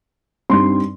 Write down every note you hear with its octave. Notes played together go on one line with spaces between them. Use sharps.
G2 G3 C4 D#4 C6